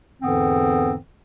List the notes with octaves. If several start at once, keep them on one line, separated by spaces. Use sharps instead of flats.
E2 G#2 D3 E3 B3 C4